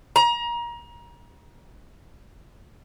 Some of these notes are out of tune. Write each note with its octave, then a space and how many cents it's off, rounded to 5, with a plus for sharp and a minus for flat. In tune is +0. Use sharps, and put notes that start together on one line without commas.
A#5 +30